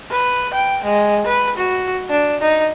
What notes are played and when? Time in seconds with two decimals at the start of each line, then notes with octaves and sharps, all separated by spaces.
0.11 B4
0.53 G5
0.84 G#3
1.27 B4
1.56 F#4
2.09 D4
2.41 D#4